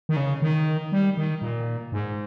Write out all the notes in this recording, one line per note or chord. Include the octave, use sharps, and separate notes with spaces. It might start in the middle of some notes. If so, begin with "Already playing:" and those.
D#3
C#3
D#3
G3
D#3
A#2
G#2